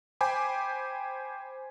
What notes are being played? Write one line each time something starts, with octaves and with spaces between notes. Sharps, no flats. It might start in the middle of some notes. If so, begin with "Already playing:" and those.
C5 G5 G#5 B5 D6